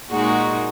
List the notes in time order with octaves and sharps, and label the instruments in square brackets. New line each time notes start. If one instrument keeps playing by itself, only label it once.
[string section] A#2 G#3 D#4 F#4 A#4